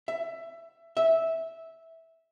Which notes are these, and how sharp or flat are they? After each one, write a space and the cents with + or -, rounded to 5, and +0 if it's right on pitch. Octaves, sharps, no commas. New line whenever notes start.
E5 +15
E5 -10